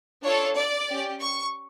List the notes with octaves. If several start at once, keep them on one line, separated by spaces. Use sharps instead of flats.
D4 F4 A4 C#5
D5
C#4 G4
C#6